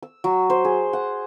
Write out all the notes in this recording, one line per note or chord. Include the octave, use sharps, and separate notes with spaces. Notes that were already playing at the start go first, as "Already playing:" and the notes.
E6
F#3
C5
G#4
F#5